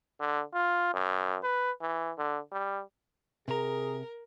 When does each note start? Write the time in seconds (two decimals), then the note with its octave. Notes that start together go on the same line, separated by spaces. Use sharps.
0.20 D3
0.54 F4
0.94 F#2
1.43 B4
1.82 E3
2.18 D3
2.52 G3
3.48 C3 G#4 A#4 A#5